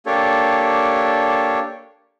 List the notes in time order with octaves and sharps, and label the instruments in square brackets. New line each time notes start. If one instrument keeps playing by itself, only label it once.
[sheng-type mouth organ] A#3 D4 G4 A4 C#5